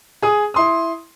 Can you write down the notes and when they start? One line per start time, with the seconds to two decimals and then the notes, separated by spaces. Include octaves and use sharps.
0.22 G#4 D#6
0.54 E4 C6 D#6